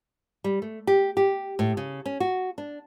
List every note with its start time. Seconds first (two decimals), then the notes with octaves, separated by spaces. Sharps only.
0.44 G3
0.62 A3
0.87 G4
1.17 G4
1.59 A2
1.77 C#3
2.06 C#4
2.20 F#4
2.58 D4